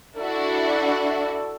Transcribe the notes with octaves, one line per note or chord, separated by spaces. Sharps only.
D4 E4 F#4 A4